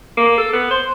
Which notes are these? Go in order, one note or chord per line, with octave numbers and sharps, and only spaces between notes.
A#3
A4
B3
C5